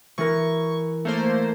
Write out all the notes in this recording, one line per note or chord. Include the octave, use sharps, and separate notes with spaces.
E3 A#4 C#6
A3 A#3 C5